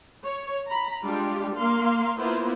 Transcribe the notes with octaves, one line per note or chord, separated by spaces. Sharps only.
C#5
A#5 B5
G3 G#3 D4 F4 G4
A#3 F5 C6
A#3 B3 E4 F4 C5